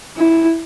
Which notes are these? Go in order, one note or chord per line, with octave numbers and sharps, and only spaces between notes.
E4